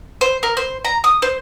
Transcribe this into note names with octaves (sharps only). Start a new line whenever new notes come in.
C5
A#4
C5
A#5
D#6
C5